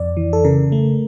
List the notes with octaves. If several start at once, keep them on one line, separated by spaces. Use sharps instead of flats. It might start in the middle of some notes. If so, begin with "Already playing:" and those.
Already playing: F2 D5
E3
A4
C#3 A#4
A3